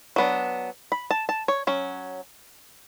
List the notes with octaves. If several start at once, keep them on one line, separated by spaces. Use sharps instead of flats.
F#3 B3 D4
B5
A5
A5
C#5
F#3 C#4